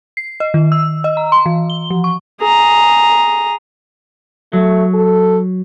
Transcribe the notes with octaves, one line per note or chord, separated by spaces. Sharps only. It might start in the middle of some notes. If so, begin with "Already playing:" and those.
C7
D#5
D#3
E6
D#5
A#5
C6
E3
G7
F3
C#6
G#4 A#5
F#3 A3
A4